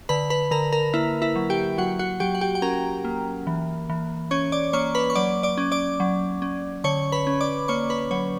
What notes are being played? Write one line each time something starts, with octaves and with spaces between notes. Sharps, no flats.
D3 B4 B5
B4 B5
D3 A#4 A#5
A#4 A#5
A#3 E4 E5
E4 E5
F#3
G4 G5
F#3 F#4 F#5
F#4 F#5
F#3 G4 G5
F#5
G4 G5
G5
C#4 A#4 A#5
A#3
E3
E3
C#4 C#5 C#6
D5 D6
A#3 C#5 C#6
B4 B5
C#6
F#3 D5 D6
D5 D6
C#4
D5 D6
F#3
C#4
D3 C#5 C#6
B4 B5
C#4
D5 D6
A#3 C#5 C#6
B4 B5
F#3 C#5